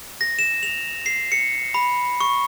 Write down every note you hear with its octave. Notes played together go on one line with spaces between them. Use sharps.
A#6
E7
F7
C7
C#7
B5
C#6